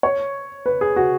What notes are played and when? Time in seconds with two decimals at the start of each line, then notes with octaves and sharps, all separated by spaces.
0.03 C#5
0.66 B4
0.81 G#4
0.96 F#4